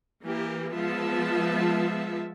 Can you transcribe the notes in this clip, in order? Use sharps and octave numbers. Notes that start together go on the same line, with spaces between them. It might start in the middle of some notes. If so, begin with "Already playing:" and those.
E3 A#3 G4
F3 G#3 B3 F4 E5 A5